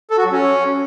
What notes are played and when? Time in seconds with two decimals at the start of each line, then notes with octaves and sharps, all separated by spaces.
0.10 A4
0.18 F#4
0.25 F#3
0.32 C#4